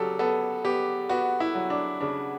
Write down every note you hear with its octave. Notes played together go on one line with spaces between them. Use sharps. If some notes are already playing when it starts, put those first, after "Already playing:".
Already playing: C#3 F#3 G4 A4
B3 A4
B3 G4
B3 F#4
E4
F#3
D4
C#3 D4